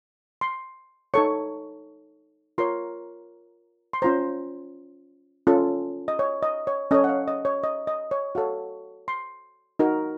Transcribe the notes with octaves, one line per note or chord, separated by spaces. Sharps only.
C6
D#4 A4 C#5 C#6
F4 A#4 C#5 C6
C6
C#4 F4 C5 A#5
C#4 F4 A4
D#5
C#5
D#5
C#5
C#4 A4 C#5 D#5
F#5
F5
D#5
C#5
D#5
D#5
C#5
F#4 A4 C#5 F5
C6
D#4 F#4 A#4